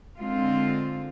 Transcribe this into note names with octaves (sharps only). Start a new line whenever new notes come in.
D3 G#3 C4 F4